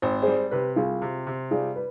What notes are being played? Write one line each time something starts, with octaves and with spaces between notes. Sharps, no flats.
G#1 C5
G3 G#4 C5
C3 G4 B4
C2 F4 G#4
C3
C3
G3 F4 G#4
B4